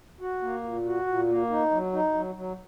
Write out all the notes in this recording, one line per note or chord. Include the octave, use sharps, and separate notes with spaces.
F#4
A#3
A#2
F#4
A#2
A#3
D#4
F#3
D#4
F#3
F#3